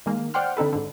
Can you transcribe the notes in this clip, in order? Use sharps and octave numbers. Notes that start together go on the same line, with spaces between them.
D#3 G#3 A#3
C5 D5 F#5 G5 C6 F6
D3 C4 D#4 A4 B4
G#2 D3